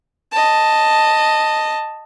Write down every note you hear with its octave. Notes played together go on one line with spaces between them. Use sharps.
D#5 A5